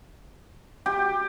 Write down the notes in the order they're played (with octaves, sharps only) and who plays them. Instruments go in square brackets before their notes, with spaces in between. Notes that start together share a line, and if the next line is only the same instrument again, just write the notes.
[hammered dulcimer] G4